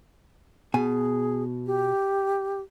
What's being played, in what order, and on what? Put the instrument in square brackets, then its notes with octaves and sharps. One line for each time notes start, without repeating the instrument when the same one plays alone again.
[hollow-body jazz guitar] B2 G#5 [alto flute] G#4
[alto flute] G4